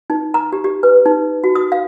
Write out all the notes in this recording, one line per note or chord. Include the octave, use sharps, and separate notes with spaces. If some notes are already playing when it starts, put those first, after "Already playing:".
D#4
A#5
G4
G4
B4
D#4
F#4
D#6
F5